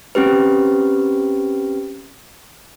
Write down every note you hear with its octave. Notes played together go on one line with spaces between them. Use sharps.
C4 C#4 G4 B4